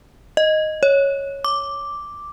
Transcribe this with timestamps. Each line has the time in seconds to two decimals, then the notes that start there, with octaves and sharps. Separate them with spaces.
0.37 D#5
0.83 C#5
1.44 D6